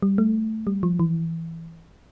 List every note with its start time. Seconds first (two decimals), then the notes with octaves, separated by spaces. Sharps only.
0.02 G3
0.18 A3
0.67 G3
0.83 F3
0.99 E3